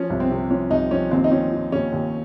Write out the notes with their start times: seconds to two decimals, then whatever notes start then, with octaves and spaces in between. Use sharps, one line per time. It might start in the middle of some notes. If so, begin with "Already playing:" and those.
Already playing: F3 C#4
0.10 C2
0.20 C4
0.30 C3
0.50 F3 C#4
0.70 C2 D#4
0.91 F3 C#4
1.11 D#2 C4
1.24 D#4
1.32 F3 C#4
1.52 F3
1.72 D#2 C#4
1.92 D#2